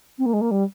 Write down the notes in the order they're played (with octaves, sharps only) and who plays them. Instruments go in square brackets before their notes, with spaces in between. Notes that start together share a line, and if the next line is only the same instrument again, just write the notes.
[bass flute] C4
A#3
G#3
A#3
G3